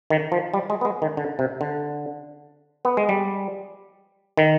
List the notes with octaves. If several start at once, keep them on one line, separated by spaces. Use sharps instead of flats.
D#3
F3
G3
G#3
B3
G#3
D#3
D3
C3
D3
B3
G#3
G3
D#3